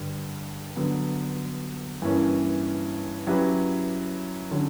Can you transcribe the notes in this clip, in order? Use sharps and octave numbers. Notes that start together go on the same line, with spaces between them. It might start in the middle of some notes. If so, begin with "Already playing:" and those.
Already playing: G2 D3 G3
D3 F#3 B3
G2 E3 A#3 C#4
F#3 C#4 E4 G4 B4
D3 F#3 C#4